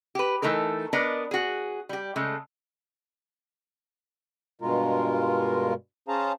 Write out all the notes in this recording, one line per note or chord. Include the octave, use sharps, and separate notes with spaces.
G4 B4
E3 A3 D#4 A4 A#4
B3 D4 A#4 B4 D5 D#5
F#4 G#4
G3 G4
C#3 G#3 A3
G2 B2 G#3 F4 A#4
C#4 G#4 C5 F5 A5 A#5